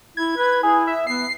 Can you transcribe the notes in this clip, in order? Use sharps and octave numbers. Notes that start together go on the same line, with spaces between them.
E4 G#6
B4
E4 G#4
E5
B3 C7